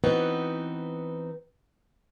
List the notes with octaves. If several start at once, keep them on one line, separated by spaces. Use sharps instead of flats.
E3 B3 C4 D#4 F#4 B4